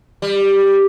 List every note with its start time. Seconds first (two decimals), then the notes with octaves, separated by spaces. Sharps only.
0.22 G3